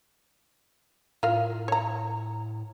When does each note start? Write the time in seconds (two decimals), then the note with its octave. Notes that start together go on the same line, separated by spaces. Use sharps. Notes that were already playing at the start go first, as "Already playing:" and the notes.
1.23 A2 F4 A#4 F5
1.68 C#5 A#5